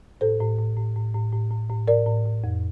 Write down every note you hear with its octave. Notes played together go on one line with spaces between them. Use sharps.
A2 A4 C5
A2
A2
A2
A2
A2
A2
A2
A2
A2 A#4 D5
A2
A2
F2